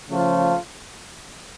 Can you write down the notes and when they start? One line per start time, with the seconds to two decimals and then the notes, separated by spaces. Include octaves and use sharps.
0.11 C#3 F3 A3 F4